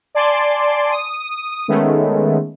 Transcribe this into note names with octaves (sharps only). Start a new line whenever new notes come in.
D5 G#5 A5 C6 D6
D#6
D#3 G#3 A3 B3 C#4